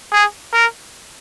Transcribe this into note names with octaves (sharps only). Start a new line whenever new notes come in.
G#4
A#4